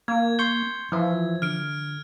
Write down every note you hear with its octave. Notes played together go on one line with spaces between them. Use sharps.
A#3 G#6
C6 C#6 G6
E3 F3 E5
D3 F6 D7